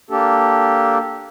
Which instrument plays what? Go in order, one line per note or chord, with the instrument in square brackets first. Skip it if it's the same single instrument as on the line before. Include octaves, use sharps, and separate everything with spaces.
[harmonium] A#3 D4 G4 A4